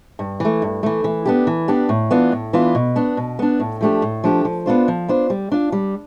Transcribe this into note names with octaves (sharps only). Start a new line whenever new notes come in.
G2
E3 A3
G2
E3 A3
E3
B3 D4 G4
E3
B3 D4 G4
A2
E3 B3 D4 F4
A2
E3 B3 D4 F4
B2
B3 D4
B2
B3 D4
A2
F3 A3 D4 G4
A2
F3 A3 D4 G4
F3
B3 D4 F4 C5
F3
B3 D4 F4 C5
G3
D4 F4
G3